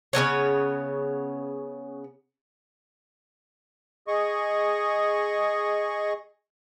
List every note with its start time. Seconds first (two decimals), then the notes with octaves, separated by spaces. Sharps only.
0.13 C#3 F#3 B3 C#5
4.08 G#4 D#5 C#6